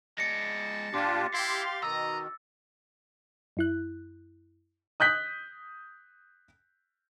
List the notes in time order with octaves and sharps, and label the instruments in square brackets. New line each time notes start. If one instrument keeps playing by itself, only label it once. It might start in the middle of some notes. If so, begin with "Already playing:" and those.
[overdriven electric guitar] G#3 D5 [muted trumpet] A5 [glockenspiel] A#6 C#7
[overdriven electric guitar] A#2 [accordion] D4 F4 G4 [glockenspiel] D6 A6
[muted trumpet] E4 [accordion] G4 C6 [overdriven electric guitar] F5
[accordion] B2 D#3 [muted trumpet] D#5 [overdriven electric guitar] A#5 [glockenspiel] E6
[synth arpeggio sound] F#2 E4 F#6
[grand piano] D#6 F#6 G6 B6